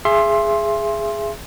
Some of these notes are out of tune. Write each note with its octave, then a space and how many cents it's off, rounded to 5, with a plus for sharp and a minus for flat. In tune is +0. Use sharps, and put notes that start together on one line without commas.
G#4 +0 E5 +30 C6 +15